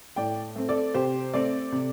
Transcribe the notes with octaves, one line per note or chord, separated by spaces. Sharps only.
A2 D5 G5
A3 C4
A4 D5
C3 G4 C5
A3 C4 A4 D5
C3